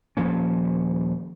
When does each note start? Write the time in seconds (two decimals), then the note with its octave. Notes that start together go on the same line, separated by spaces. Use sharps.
0.17 D#1 F3 A#3 C#4